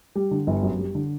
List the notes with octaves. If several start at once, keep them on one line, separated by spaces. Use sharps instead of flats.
G3
D3
G1
F#2
G3
D3